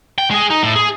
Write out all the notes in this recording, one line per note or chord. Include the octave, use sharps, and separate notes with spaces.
G5
G#3 G#4
D#4
A2
G#4